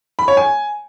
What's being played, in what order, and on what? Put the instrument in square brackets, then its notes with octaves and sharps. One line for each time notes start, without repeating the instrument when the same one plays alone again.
[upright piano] B5
C#5
G#5